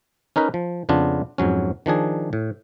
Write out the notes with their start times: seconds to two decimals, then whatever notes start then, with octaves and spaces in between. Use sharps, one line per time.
0.36 C#4 D#4 A#4 B4
0.54 F3
0.89 F2 C#3 B3 D4 F4
1.38 F2 G#2 F#3 C#4
1.86 D#3 F3 D4 G#4
2.33 A2